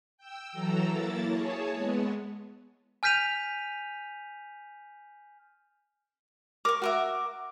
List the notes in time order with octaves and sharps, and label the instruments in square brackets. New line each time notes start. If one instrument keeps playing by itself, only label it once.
[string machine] G5 E6
E3 F#3 A4 A#5 E6
A#3 E4 A6
G#4 C#5 A5
G#3 B3
[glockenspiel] G#5 F6 G6 B6 D#7 F7
[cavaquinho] A#4 C#6 [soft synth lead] D6
[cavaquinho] F#4 A#4 E5